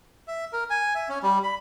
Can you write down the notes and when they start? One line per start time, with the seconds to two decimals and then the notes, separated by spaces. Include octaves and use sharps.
0.28 E5
0.53 A#4
0.70 G#5
0.95 E5
1.09 C#4
1.23 G3
1.43 B5